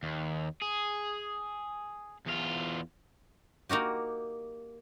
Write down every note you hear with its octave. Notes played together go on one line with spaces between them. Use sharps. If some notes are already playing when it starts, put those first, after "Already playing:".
D#2
G#4
E2 F4
A#3 D#4 F#4 G4